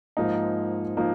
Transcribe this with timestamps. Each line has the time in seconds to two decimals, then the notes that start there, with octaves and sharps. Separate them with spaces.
0.17 G#2 F3 A#3 D#4
0.97 F3 A#3 D#4